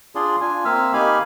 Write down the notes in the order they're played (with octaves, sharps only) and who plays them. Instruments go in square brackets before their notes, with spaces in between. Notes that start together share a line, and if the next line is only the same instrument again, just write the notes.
[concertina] D4 F4 G#4 D5 C6
D4 F4 G#5
A#3 C4 E5 F5 E6 F6
A#3 D#4 G4 F5 G#5 B5